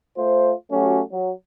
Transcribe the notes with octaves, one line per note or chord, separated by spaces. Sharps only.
A3 F4 C5
F#3 A3 C#4 F#4 G4
F#3